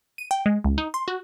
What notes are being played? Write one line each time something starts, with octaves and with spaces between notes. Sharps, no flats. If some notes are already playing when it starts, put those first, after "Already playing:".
D#7
G5
G#3
C#2
D#4
C6
F#4